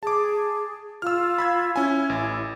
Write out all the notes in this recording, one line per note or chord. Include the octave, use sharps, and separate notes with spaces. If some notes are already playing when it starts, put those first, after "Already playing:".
G#4 A5 D6
F4 E6 F6
B5 E6 G#6
C#4 E4 G#5
A1